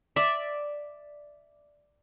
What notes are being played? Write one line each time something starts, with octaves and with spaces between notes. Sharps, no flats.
D5 E5